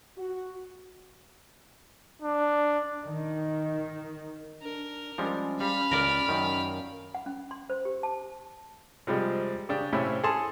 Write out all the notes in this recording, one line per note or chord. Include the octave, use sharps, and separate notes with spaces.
F#4
D4
D#3
D4 A#4
F3 G3 G#3 C#4
G3 F5 B5
C#2 A#4 D5
F#2 D#3
F#5
C#4
C6
C5
G4
A5
C3 F3 G3 G#3
C#3 D4 G4
A2 C3 C#4 E4
G#4 A4 A5 C6